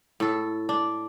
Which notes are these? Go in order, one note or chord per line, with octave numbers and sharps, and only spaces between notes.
A2 A4
D4